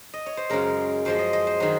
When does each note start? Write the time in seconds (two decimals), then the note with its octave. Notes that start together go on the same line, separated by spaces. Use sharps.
0.14 D#5
0.26 C#5
0.37 C5
0.50 F#2 C#3 G#3 A#4
1.05 F#2 F3 G#3 C5
1.19 D#5
1.33 D#5
1.47 C5
1.60 D#3 F#3 G#4